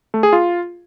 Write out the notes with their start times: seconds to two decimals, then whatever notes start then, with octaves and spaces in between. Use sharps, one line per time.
0.14 A3
0.23 G#4
0.33 F4